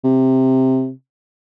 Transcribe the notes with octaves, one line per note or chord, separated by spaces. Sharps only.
C3